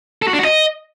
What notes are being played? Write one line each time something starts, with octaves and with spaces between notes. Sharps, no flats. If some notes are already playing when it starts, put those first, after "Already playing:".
A4
F#4
D4
F#4
D#5